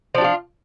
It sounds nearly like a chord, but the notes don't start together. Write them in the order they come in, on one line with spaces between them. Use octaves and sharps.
F3 D4 G4 F4